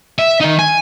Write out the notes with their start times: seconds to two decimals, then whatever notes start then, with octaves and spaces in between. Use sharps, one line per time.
0.19 E5
0.40 D#3 D#4
0.59 G#5